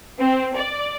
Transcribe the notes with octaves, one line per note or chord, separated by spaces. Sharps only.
C4
D5